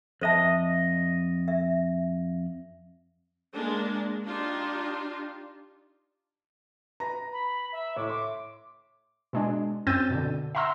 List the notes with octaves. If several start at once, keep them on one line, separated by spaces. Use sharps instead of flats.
F2 C5 D#5 E5 A5
E5
G#3 A#3 D4
D4 D#4 F4 G4
B4 A#5 A#6
B5
E5
A2 D6
C6 D6
B2 G#3 D4
F#2 C4 E6 G6 A6 D#7
B2 D3
E5 F#5 A#5 C6 E6